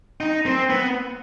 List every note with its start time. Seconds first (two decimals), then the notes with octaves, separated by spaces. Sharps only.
0.20 D#4
0.46 C4
0.70 B3